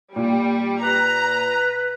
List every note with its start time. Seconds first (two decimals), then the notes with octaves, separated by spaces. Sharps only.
0.16 A#2 G3
0.83 B4 A#5